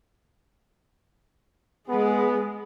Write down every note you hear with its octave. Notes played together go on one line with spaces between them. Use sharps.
G#3 B3 G#4